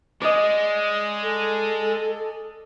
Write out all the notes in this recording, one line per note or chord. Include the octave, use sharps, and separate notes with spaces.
G#3 D5 D#5
A4